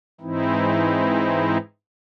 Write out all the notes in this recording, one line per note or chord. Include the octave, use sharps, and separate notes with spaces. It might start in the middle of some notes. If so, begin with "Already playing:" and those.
G#2 E3 C4 D#4 E4